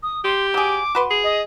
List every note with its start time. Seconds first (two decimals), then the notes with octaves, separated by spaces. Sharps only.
0.03 D#6
0.24 G4 C6
0.54 F#3 G#4 D6
0.95 F#4 B4 C6
1.11 G#4
1.24 D#5